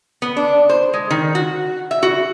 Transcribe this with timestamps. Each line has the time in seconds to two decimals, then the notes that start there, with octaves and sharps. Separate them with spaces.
0.22 B3
0.37 D4
0.69 C5
0.94 G#3
1.10 D#3
1.35 F#4
1.91 E5
2.03 F#4